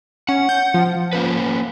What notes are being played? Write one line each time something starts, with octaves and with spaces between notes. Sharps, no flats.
C#4 F#5
G6
F3
A#3 C#4 B4